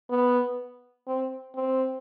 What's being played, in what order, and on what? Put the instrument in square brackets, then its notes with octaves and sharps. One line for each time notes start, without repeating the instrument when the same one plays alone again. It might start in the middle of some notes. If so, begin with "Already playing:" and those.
[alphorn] B3
C4
C4